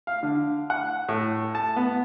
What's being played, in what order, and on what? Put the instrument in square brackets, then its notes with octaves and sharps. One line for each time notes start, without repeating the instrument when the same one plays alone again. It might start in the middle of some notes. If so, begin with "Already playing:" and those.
[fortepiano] F5
D3
F#5
A2
A5
B3